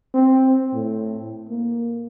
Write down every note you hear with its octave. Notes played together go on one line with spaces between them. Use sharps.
C4
A2
A#3